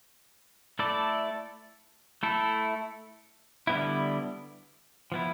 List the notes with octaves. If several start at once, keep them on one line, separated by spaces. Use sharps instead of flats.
A3 E4 A4 D5
A3 E4 A4
D3 G3 B3 E4
F3 B3 E4